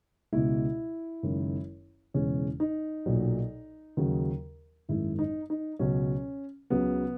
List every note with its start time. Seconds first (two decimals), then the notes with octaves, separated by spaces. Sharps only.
0.32 C#2 B2 G#3 E4
1.23 F#1 F#2 D#3 G#3
2.14 E1 E2 C#3 E3 G#3 C#4
2.60 D#4
3.06 B1 A#2 F#3
3.97 D#2 C#3 F#3
4.89 G#1 F#2 D#3 G#3 E4
5.19 D#4
5.50 D#4
5.79 C#2 B2 F#3 C#4
6.70 C#2 C#3 F#3 B3